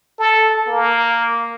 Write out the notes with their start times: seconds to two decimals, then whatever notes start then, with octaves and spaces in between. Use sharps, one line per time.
0.19 A4
0.67 A#3